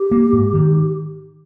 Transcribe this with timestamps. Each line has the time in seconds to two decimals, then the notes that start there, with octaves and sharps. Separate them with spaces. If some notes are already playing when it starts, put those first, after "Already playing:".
Already playing: G4
0.11 A#3
0.33 G#2
0.53 D#3